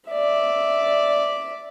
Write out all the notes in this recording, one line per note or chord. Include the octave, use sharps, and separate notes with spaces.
D5 E5